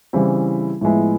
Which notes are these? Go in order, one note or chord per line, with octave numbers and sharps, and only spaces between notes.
C#3 E3 G3 C4 E4
A2 F3 G#3 B3 E4